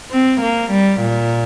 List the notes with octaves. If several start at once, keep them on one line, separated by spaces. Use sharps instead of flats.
C4
A#3
G3
A#2